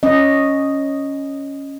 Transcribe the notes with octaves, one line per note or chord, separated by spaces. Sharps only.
C#4 D#5